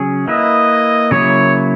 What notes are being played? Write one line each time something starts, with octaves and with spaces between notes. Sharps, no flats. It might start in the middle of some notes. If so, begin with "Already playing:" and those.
Already playing: C#3 F#3 C#4 G#4
A#3 E4 B4 D#5 E5
C#3 F#3 A#3 E4 C#5